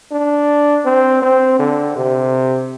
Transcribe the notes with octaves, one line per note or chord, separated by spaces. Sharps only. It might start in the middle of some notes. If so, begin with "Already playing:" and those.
D4
C4
C4
D3
C3